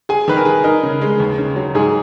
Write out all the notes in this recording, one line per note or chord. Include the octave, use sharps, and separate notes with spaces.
G#4 G#5
D#3 B4
A#4
G#4
D#4 A#4
C#3
G#3
D#2
C#3
F#3
G#2 G#4